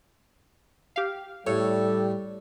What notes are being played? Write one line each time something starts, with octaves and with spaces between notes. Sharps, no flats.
G4 F5
A2 G3 A4 C#5